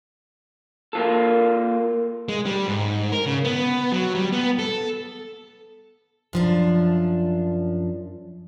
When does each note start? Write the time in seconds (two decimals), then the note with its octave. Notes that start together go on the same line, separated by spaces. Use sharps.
0.93 A#3 F4 A4
2.29 G#3
2.45 G3
2.67 G#2
3.12 A#4
3.26 C#3
3.45 B3
3.92 F#3
4.15 G3
4.32 B3
4.59 A4
6.33 F#2 F3 D4